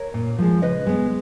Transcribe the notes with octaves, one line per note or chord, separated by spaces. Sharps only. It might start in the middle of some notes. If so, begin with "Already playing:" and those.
Already playing: A#4 C#5
A#2
F3 G#3
C#3 B4 D#5
G#3 B3